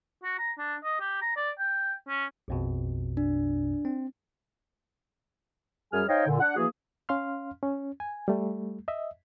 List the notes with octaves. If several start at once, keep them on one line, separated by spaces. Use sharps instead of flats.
F#4
A#5
D4
D#5
G4
A#5
D5
G5
C#4
A#1 F2 B2
D4
C4
F#2 G3 G#4 G#5 F6
D#4 C5 C#5 D#5 F5 G5
A#2 D3
D4 F#5
E3 F3 A#3 F#4 G#4
C#4 F5 C6 F6
C#4
G#5
G3 A3
D#5 E5